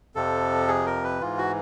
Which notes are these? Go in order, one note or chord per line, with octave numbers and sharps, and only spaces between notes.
F2 C3 F3 A4
G#4
A#4
B4
G#2 E3 F4
F#4